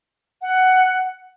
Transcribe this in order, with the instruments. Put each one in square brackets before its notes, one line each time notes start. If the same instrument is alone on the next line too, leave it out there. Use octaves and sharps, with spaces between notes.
[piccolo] F#5